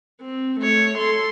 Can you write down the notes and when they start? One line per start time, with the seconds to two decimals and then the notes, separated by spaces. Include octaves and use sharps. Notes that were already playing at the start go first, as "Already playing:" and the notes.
0.21 C4
0.59 A3 C#5
0.97 A4 C6